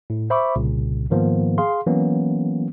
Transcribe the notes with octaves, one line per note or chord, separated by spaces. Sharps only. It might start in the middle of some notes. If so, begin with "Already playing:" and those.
A2
C5 E5 B5 C#6 D6
C2 A#2 C#3
G#2 D#3 F3 A#3 B3
G#4 F5 C6
E3 F#3 A#3 B3 C#4